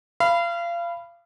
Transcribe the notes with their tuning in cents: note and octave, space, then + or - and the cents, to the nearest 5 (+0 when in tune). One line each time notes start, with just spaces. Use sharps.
F5 -30 B5 +0